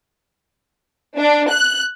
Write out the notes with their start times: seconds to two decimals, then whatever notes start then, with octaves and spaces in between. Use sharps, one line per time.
1.17 D4
1.50 F#6